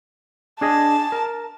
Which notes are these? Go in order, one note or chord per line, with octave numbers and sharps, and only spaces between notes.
D4 G#4 D#5 A5
A#4